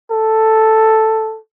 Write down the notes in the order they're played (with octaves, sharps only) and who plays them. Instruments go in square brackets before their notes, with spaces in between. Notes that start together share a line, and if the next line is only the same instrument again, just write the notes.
[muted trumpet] A4